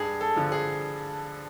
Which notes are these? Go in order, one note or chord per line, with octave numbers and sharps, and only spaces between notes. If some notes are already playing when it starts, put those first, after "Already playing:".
Already playing: G2 G#4
A4
D3 F3
G#4